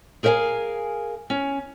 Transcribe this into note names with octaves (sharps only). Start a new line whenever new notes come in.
G#4 A#4 C5 E5 F5 G#5
C#4